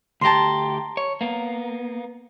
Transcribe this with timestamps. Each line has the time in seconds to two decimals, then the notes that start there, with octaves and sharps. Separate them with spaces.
0.21 D2 G4 A5 A#5 C6
0.97 C#5
1.21 A#3 B3